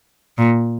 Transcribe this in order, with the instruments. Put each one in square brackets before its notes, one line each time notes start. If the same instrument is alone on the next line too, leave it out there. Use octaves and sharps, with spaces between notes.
[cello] A#2